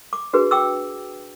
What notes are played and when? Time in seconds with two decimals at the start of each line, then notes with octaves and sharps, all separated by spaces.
0.13 D6
0.33 D4 F#4 G#4 B4
0.51 G5 D6 E6